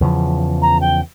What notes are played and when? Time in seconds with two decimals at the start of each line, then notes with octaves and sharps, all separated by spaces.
0.01 E2 C#3 F3
0.62 A#5
0.80 G5